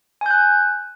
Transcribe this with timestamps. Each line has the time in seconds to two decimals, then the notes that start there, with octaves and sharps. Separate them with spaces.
0.21 G#5
0.26 G6
0.31 F#6